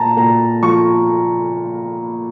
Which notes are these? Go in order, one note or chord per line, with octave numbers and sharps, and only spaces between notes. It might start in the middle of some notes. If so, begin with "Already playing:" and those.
Already playing: A#2 A5 A#5
A#2 A#5
F3 C#6